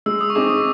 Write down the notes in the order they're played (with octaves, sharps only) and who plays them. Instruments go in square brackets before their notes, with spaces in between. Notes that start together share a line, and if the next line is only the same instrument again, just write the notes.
[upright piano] G#3 [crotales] E6
[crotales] D#6
C#6
[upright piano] C4 D#4 G#4 [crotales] D6
[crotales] D#6